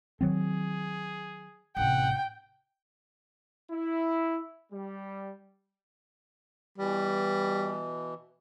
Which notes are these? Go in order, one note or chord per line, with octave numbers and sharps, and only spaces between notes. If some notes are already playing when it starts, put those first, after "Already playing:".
D#3 F#3 C4 G#4
A1 C3 F#5 G5
E4
G3
B2 E3 G3